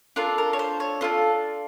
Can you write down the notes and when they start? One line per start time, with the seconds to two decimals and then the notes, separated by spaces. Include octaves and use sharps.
0.16 D4 F4 A4 A#4
0.38 A#4
0.53 C#5
0.59 C5
0.80 C#5
1.01 D4 F4 A4 C5